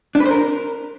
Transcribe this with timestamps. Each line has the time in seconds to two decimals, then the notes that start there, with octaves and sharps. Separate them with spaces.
0.15 D4
0.20 B4
0.26 C5
0.31 A#4